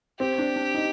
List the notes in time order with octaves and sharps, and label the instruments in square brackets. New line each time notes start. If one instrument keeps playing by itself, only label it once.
[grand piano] C4 [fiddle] G4
[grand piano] D4
D4
D#4